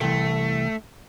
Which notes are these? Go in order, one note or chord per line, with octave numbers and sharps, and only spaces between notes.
C2 E3 A3